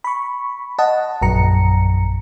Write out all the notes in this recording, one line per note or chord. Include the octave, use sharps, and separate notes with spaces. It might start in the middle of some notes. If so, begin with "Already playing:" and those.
B5 C#6
D#5 F#5 A5
A#1 F#2 A#5 C#7